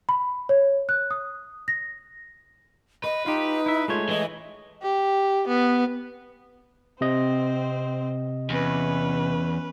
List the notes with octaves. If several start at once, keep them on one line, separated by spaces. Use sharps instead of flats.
B5
C#5
F#6
D#6
A#6
B4 D#5
D#4 F4 G4
E4 E5
G#3 A3 F4 C#5
E3 D#5
G4
B3
C3 C4 C5 D#5
E2 C#4 B4